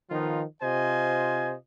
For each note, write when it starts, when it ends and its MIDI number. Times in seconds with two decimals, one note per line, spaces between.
0.10 0.43 51
0.10 0.43 53
0.10 0.43 59
0.10 0.43 63
0.10 0.43 65
0.62 1.54 48
0.62 1.54 65
0.62 1.54 72
0.62 1.54 75
0.62 1.54 80